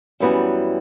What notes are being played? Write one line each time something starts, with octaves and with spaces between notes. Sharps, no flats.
F#2 E3 G3 B3 F#4